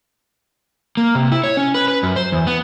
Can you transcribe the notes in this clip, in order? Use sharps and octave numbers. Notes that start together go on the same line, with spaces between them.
A#3
C3
E4
C#5
C#4
B4
B4
F#2
C5
E2
B3